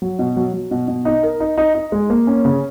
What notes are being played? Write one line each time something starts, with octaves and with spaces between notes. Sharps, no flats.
F#3
B2
F#3
F#3
B2
B2
D#4
A#4
D#4
D#4
D#4
G#3
A#3
C#4
C#3